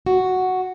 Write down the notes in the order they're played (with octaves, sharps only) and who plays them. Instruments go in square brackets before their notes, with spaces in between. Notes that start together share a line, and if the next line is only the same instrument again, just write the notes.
[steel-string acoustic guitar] F#4